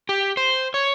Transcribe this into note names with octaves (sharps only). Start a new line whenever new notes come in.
G4
C5
C#5